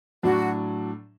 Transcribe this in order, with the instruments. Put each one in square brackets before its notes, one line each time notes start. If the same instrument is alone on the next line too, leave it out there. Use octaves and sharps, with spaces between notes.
[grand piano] A2 F#3 D4 [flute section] F#4